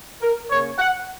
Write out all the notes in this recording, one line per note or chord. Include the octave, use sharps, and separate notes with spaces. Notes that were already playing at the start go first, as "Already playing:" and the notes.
A#4
C#3 A#3 C#4 C#5
F#5